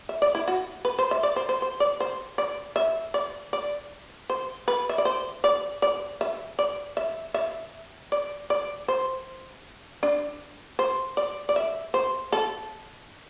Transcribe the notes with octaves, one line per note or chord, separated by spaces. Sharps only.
E5
D5
E4
F#4
B4
C5
E5
D5
C5
C5
C5
D5
C5
D5
E5
D5
D5
C5
B4
E5
D5
C5
D5
D5
E5
D5
E5
E5
D5
D5
C5
D4
C5
D5
D5
E5
C5
A4